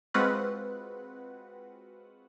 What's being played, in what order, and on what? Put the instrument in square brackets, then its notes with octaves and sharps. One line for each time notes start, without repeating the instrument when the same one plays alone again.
[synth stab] G#3 C4 F4 F#4 B4 F#5